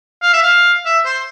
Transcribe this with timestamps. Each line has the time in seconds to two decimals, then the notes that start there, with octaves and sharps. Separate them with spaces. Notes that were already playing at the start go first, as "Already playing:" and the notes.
0.22 F5
0.33 E5
0.43 F5
0.86 E5
1.05 C5